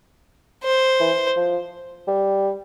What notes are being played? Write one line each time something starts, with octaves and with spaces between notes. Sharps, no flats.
C5
E3
F3
G3